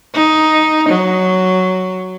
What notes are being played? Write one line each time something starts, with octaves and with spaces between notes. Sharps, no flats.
D#4
F#3